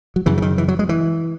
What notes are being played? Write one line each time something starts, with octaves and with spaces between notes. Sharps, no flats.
F#3
F#2 C#3 E3
E3
D#3
E3
F#3
G#3
E3